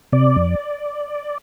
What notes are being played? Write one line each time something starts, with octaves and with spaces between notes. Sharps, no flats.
C3 D5
F2